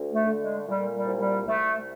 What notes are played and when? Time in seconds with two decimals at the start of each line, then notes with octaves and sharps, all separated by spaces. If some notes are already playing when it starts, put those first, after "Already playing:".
Already playing: D2
0.12 A3
0.26 D3
0.39 G#3
0.66 A#2 G3
0.93 G3
1.06 C2
1.19 G3
1.46 C2 A3